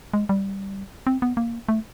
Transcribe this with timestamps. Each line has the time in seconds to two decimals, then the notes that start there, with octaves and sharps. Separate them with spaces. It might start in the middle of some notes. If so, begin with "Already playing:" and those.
0.14 G#3
0.29 G3
1.07 C4
1.22 B3
1.37 A#3
1.69 A3